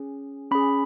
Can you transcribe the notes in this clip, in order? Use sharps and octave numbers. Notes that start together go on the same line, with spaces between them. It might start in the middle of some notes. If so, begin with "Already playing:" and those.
Already playing: C#4 G#4
C#4 G#4 B5